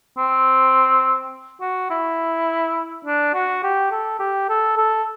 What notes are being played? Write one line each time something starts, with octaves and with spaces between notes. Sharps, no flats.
C4
F#4
E4
D4
F#4
G4
A4
G4
A4
A4